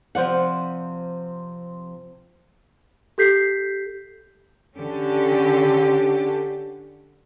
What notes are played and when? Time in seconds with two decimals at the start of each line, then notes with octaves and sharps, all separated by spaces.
0.15 C3 F3 D5 F#5
3.18 G4 A4 G6 B6 C7
4.77 D3 C#4 G4 A4